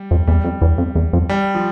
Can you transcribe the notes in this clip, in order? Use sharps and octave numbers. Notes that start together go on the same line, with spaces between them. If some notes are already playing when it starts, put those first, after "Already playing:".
Already playing: G3
F2
E2 G3
F2
E2
F2
E2
F2
G3
F3